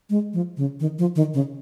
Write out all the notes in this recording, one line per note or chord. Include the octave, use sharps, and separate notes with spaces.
G#3
F3
C#3
D#3
F3
D#3
C#3